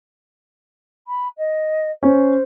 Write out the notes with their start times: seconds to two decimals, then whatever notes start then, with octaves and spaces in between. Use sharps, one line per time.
1.07 B5
1.37 D#5
2.03 C#4 C5